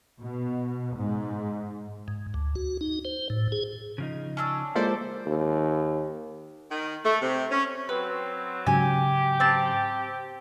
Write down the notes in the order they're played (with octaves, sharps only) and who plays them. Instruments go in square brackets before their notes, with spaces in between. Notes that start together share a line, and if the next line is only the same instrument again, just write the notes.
[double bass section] B2
G#2
[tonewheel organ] G#2
D2
F#4
D#4
C5
A2
G#4
[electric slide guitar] C#3 F3 D#4
[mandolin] C#4 D4 E6
[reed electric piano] G#3 A#3 F4 [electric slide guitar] E4 [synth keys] A4 C5 D5
[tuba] D#2
[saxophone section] D#3
A3
C3
C#4
[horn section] F#3 C4 [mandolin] B4
[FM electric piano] G#2 C#3 F#3 [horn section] G4 [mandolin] G#5
[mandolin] C4 A5